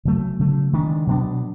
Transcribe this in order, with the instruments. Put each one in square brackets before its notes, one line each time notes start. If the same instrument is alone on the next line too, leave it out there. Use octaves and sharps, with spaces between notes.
[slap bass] C#3 F#3 A3
C#3 F#3 A3
D#3 G#3 B3 D4
B2 F#3 B3 D4